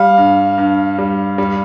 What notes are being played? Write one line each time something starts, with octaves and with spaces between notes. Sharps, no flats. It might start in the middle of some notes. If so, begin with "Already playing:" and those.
Already playing: G3 F5
G2
G2
G3
G3